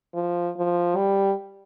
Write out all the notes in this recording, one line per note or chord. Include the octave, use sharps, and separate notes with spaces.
F3
F3
G3